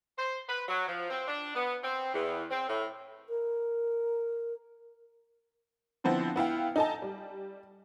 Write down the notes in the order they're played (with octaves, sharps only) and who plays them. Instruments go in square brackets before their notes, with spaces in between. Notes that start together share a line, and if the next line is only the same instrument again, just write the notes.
[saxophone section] C5
B4
F#3
F3
C4
D4
B3
C4
E2
C4
A2
[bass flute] A#4
[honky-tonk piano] D3 F3 B3 C4 E4
B3 E4 F5 G5
D#4 A4 D#5 G#5 A5
G3